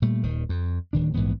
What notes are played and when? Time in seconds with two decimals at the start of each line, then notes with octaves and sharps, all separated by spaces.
0.02 A#2 G3 A3
0.23 D#1 D#3
0.49 F2
0.93 D1 D#3 D4
1.15 A#1 G#2 E3 B3